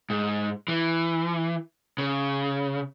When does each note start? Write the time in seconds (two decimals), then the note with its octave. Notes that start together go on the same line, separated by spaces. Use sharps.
0.10 G#2
0.68 E3
1.98 C#3